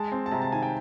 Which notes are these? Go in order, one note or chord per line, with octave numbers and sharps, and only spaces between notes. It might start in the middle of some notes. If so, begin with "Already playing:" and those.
Already playing: G#3 A5
C4
A5
C3 A#5
A5
D#3 G#5
G5